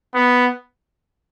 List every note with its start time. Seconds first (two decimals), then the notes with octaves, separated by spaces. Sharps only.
0.15 B3